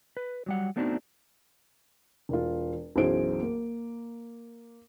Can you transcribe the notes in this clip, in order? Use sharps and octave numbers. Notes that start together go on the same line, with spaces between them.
B4
F#3 G3 F#5
A3 B3 C4 D4 D#4 F#4
E1 F4
B1 F#2 E3 G#4 C5 D7
A#3